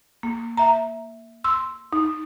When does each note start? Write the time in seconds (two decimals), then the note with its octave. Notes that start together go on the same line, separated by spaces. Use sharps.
0.23 A#3
0.57 E5 A#5
1.44 C6 E6
1.93 D#4